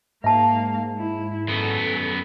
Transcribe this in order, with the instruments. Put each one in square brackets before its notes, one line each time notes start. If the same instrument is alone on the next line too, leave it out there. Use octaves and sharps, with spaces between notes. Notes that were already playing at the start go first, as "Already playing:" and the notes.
[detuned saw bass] G#2 [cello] A#3 F5 [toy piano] E5 A5
[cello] E4
[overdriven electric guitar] F#2 B3 [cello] A4